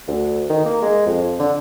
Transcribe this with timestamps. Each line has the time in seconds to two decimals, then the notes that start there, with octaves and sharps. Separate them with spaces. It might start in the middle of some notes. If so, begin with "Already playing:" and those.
0.08 D2
0.50 D#3
0.65 A#3
0.82 G#3
1.06 F2
1.39 D3